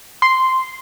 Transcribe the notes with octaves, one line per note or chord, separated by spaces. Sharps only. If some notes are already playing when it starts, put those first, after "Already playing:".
C6